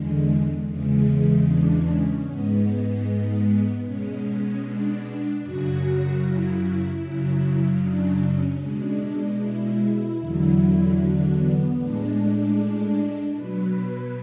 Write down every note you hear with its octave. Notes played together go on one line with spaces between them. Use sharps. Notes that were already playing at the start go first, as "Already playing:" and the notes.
Already playing: E2 D3 G#3
E2 C#3 E3 G#3
D4
C#4
G#2 G#3 B3
B2 G#3 C#4
D4
F#2 C#3 F#3 F#4
E4
F#2 C#3 F#3
D4
C#4
B2 G#3 D4
E4
E2 D3 F#3
D4
B3
A2 G#3 D4
B2 F#3 B4